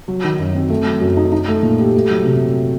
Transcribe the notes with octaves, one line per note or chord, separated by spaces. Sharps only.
F#3
D#3
F#2
C4
A3
F#3
F#2
D#4
D#4
A3
A#2
G4
A3
F#3
C3